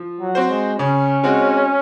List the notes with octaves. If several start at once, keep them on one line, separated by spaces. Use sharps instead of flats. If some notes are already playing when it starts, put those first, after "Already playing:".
Already playing: F3
F#3
C4 F#4 C5
G#3
C#3 C#4
G#3 C4 F#4